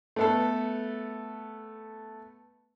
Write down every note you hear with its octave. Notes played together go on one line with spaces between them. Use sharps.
A3 B3 A4